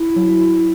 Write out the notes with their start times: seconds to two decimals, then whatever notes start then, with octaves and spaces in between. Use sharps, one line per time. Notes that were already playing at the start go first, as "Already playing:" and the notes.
Already playing: E4
0.16 F#3